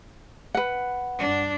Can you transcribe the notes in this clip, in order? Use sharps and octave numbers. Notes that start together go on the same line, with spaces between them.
B4 F#5
G2 D4